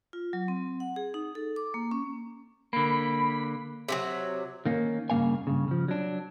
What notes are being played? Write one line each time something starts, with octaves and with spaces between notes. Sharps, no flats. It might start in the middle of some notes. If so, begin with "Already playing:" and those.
F4
F#3
C4
F#5
G#4
D#4
A4
D6
A#3
C#4
D3 A#3 B5
C3 E3 F#3
D#3 A#3 C#4
G2 C#3 A#3 F5 G#5
G2 A#2 C#3
C#3 F3
F#3 D4